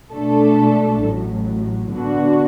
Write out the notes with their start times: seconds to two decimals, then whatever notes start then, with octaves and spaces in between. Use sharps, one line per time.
0.12 B2 A3 D4 A4
1.03 A1 A2 F#3
1.93 D3 B3 D4 F#4